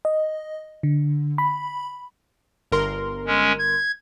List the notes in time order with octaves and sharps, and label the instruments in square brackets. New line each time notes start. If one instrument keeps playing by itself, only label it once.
[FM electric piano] D#5
D3
B5
[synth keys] G1 A#4 C6
[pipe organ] G#3 C#4
G#6